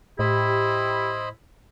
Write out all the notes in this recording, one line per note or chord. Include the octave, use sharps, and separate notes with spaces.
A2 E4 G4 C5 D#5 B5